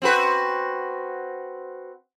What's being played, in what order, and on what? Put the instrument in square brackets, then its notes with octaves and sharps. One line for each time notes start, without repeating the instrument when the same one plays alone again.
[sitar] C4 F#4 B4